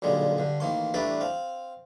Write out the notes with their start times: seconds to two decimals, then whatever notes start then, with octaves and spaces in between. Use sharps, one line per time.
0.02 B1 A#2 D3 G3 G#3
0.38 G2 D3
0.60 A1 D#3 A#3 C6
0.94 A1 G3 A3 D4 B4 D5
1.21 C4 F5